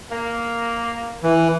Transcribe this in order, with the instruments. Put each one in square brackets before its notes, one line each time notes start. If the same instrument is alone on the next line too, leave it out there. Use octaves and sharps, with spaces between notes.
[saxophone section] A#3
[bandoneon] E3